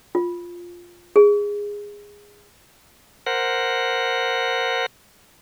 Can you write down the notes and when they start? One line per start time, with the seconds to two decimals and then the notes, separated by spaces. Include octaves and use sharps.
0.15 F4
1.16 G#4
3.26 A#4 C5 F#5